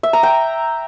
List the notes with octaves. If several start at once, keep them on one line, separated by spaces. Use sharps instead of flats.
E5
A#5
G5